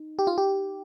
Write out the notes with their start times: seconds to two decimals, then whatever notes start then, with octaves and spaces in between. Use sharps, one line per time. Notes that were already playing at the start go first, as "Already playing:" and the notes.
Already playing: D#4
0.19 G4
0.27 F4
0.38 G4